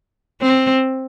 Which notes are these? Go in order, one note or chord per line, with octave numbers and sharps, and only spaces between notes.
C4